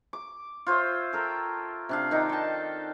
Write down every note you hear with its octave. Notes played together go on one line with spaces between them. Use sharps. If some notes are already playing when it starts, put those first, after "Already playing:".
D6
F4 C5 C#5 E5
A4 A#4 G5
C3 D4 F5
D#3 D4 D#4
G5 A5